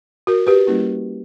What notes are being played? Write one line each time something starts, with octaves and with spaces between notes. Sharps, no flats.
F#4 A#4
G4 B4
G3 A#3 C#4 E4